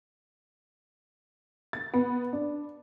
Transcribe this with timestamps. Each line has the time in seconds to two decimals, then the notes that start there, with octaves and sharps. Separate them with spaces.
1.73 A6
1.94 B3
2.33 D4